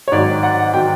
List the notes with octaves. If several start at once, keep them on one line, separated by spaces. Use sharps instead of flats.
C#5
G#2 D#3 F#3 D5
F#5
D#3 F#3 G5